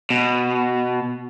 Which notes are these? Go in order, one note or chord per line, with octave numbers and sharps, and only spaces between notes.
B2